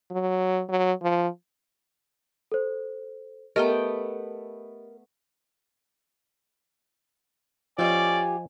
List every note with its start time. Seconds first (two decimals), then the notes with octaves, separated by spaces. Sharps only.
0.11 F#3
0.69 F#3
1.02 F3
2.52 A4 C5
3.56 A3 B3 G4 A#4 D#5 G5
7.78 A2 F3 C#4 F4 G4 D5 D#5 G#5